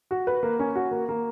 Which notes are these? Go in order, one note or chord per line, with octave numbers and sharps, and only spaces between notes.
F#4
B4
A#3
C#4
F#4
A#3
A#3